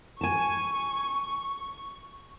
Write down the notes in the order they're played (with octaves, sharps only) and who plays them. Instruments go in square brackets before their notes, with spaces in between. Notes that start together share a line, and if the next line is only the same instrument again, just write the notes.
[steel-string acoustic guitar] G#5 A5 [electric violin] C#6